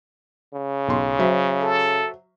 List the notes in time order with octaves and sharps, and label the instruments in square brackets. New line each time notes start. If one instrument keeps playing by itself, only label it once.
[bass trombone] C#3
[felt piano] B1 C6
F#3 C5 E5
[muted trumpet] A4